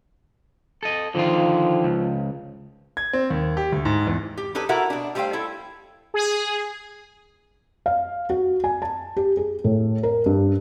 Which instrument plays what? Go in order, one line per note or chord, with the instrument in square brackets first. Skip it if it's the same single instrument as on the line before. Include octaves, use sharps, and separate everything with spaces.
[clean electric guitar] A4 D#5
[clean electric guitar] D3 D#3 F4 [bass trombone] F3
[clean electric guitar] C#2
[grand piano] G#6
C4
D#2
G4
D2
G#2
E2
[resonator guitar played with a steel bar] G4
D#4 G4 A4 B4 C#5
E4 F#4 A4 A#4 E5 F#5
B2 D4
G3 A3 C5 C#5 F5 G5
E4 A4
[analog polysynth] G#4
[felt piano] F5
F#4
G#5
A5
G4
G#4
A2
A#4
G2